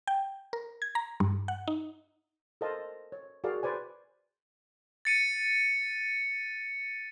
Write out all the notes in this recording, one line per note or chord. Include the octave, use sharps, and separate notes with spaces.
G5
A#4
G#6
A#5
G2
F#5
D#4
A4 A#4 C5 D#5 F5 A5
C#5
F#4 G#4 A#4 D5 F5
B4 C5 D5 G#5
A6 C#7 D#7